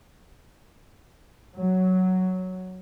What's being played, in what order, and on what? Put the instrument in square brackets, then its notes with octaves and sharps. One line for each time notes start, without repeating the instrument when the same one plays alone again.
[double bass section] F#3